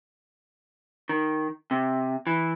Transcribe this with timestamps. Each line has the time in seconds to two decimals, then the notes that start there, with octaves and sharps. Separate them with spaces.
1.09 D#3
1.71 C3
2.27 E3